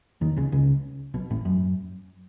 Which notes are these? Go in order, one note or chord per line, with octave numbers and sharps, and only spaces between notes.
D#2 D#3
C#2 C#3
C#2 C#3
B1 B2
A1 A2
F#2